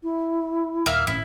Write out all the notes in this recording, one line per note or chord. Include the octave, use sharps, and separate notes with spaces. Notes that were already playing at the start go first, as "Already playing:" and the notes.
E4
D#1 A#3 E5 F6
G#1 A2 C#4 E4